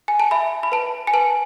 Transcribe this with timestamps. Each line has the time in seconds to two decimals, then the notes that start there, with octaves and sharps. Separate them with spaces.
0.08 G#5
0.20 A5
0.31 E5 B5
0.63 B5
0.72 B4 A5
1.07 G#5
1.14 B4 A5